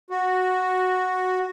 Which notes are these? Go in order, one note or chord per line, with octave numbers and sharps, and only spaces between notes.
F#4